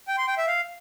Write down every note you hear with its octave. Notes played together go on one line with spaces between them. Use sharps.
G5
C6
G5
E5
F5